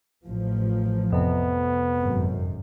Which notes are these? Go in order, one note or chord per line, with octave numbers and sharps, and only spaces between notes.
A1 F3
F2 C3 B3
G#1 F#2